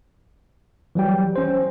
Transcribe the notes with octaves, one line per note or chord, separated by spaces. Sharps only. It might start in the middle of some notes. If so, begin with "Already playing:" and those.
E3 F#3 G3 G5
C#4 C5